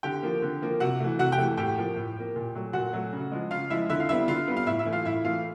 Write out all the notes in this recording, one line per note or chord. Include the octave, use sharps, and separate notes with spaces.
D3 G4 G5
F3 A#3
D3
F3 A#3
C3 F#4 F#5
E3 A3
C3 F#4 F#5
G4 G5
E3 A3
A2 G4 G5
F3 A#3
A2
F3 A#3
A#2
F#3 A3
A#2 F#4 F#5
F#3 A3
C#3
F3 G#3
C#3 F4 F5
F3 G#3 E4 E5
D3 E4 E5
F5
G3 B3 E4 E5
D3 F4 F5
G3 B3
F5
A2 E4 E5
E4 E5
E3 A3
F4 F5
A2 E4 E5
E3 A3 F4 F5